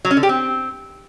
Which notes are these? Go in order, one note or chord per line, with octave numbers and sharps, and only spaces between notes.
F#3
C#4
D3
G4
C4